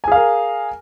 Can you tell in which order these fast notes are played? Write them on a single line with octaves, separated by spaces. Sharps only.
G#5 G#4 F5 A#4